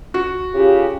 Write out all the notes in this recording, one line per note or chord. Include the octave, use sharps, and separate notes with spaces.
F#4
C#3 F4 G4